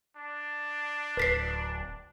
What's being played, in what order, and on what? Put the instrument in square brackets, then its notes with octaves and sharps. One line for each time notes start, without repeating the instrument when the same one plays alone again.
[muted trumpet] D4
[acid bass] D1 [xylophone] B4 B6 C7